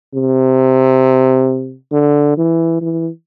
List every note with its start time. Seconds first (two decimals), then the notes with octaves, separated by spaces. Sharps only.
0.14 C3
1.92 D3
2.37 E3
2.81 E3